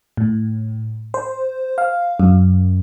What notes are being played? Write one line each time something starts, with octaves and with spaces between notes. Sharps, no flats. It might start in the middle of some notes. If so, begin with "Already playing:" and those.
A2
C5
F5
F#2